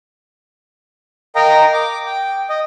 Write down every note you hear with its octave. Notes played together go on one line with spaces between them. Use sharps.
A#4 D#5 F5 G5 A#5
D6
G5
D#5